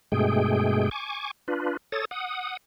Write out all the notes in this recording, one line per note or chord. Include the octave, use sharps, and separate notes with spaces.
G2 B2 G#3 A3 G#4 G5
G#5 C#6 D6
D4 F4 B4
A4 C#5 D#6 A6
F#5 D#6